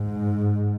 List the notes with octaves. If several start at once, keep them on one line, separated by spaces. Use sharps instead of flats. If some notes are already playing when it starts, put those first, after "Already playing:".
Already playing: G#2